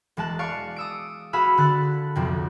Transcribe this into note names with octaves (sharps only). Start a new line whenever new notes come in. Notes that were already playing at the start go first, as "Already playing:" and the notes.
E1 G#3 A5 F#6
D5 F5 C#6
D#6 E6 D7
F#4 G#4 F5 B5 D#6 E6
D3 F#6 A6
B1 F2 C3